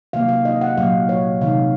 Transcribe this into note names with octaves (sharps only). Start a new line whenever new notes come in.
C3 D#3 F#3 A#3 F5
F5
D#5
F#5
A#2 F#3 A#3 F5
C#5
C3 D#3 G#3 F5